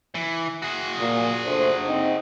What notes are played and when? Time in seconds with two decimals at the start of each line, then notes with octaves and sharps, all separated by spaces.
0.15 E3
0.62 F#4 G#4
0.99 A#2
1.45 A3 D4 C5
1.87 C4 D#4